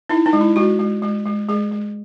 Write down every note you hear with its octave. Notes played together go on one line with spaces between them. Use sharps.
D#4 E4
D#4
G#3
E4
G#3 F#4
G#3
G#3
G#3
G#3 G#4
G#3